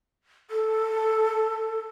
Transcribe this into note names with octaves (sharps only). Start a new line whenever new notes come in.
A4